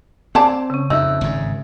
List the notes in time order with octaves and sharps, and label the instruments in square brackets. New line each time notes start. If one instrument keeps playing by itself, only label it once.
[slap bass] C4 [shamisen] G#4 D5 A5
[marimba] C#3 C#4
[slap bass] F2 [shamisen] D#4 [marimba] E5 E6
[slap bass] G#1 G#2